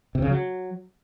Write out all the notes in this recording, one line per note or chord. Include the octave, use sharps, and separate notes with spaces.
C3
C#3
F#3